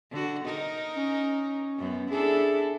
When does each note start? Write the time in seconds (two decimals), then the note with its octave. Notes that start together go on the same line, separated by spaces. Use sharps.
0.11 D3 F#4
0.45 D#4 A#4
0.97 C#4
1.79 F#2 B3
2.11 D4 E4 G#4 A4